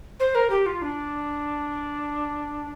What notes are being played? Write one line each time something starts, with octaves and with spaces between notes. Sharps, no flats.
C5
A#4
G4
F4
D4